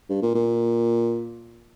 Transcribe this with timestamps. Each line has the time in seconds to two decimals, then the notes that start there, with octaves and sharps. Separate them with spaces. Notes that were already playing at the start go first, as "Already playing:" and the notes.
0.09 G2
0.22 A#2
0.35 A#2